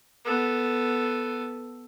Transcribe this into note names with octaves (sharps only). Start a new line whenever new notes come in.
B3 A4